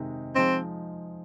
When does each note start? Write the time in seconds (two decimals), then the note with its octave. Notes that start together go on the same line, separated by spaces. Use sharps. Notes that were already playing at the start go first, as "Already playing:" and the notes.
Already playing: C3 D#3 G#3 D#4
0.35 F3 G#3 C4 D#4